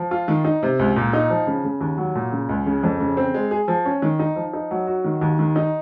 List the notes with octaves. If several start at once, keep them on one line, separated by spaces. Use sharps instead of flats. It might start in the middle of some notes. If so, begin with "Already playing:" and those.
Already playing: F3
F4
D#3
D#4
C3
C#2
A#2
D#4
F3
C#3
C#3
D#2
F#3
A#2
C#3
C#2
C#3
F2
C#3
C4
G#3
G#4
F3
C#4
D#3
D#4
F3
D#4
F#3
F#4
D#3
D#2
D#3
D#4